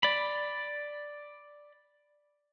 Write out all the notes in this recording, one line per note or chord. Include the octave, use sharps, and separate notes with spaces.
D5 B5